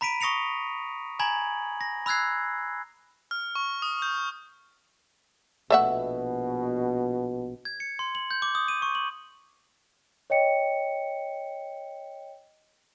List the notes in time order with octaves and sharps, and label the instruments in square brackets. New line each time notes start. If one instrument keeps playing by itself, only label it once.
[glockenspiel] A#5 B5 B6 D7 D#7
C#6 D#6 A#6 C#7 F7
G#5 A#5 B5 G#6 F#7
A#6
B5 E6 F#6 G#6 C7
[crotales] F6
C#6
D#6
G6
[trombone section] A#1 B2 [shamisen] A3 E5 F#5
[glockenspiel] G#6
C#7
C6
F#7
G6
D6
D#6
D#7
C#6
F#7
[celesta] C#5 D#5 G5 C#7